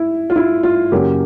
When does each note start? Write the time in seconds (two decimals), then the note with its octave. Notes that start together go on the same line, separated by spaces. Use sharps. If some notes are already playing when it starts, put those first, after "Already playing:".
Already playing: E4
0.30 F4
0.36 E4
0.63 F4
0.92 F#2 C#3 F#3 A#3 C#4 G4